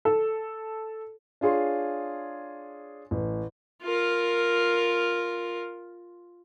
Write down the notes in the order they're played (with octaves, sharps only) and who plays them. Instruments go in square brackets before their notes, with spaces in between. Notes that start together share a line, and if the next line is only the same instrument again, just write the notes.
[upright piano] A4
[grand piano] D4 F4 G#4 C#5 C6
A1
[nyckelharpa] F4 A#4